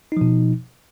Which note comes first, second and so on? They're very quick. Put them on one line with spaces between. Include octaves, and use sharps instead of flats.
D#4 F3 B2